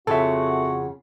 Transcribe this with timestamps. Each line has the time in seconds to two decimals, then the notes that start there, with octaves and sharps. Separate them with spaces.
0.07 F2 C#3 C4 F#4 A4 E5 F#5